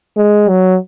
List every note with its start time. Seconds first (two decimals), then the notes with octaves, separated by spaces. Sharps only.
0.17 G#3
0.49 F#3